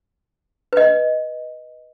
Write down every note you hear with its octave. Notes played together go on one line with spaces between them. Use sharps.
B4 D#5